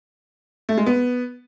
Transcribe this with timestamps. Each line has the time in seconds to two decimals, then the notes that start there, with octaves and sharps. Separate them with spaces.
0.69 A3
0.78 G#3
0.86 B3